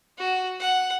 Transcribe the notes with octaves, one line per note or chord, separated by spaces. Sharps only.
F#4
F#5